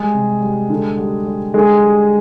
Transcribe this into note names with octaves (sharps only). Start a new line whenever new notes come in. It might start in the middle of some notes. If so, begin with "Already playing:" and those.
Already playing: G3 G#3 G#4
C3
G3
D3
G3
G3
D3 G#3 G#4
G3